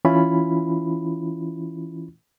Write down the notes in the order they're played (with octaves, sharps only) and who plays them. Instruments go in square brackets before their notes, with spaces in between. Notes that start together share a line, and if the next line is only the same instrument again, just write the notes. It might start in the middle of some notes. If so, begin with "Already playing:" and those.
[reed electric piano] E3 C#4 E4 F4 B5